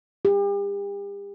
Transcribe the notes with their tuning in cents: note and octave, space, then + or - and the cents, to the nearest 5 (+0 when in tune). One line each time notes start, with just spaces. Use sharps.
G4 +40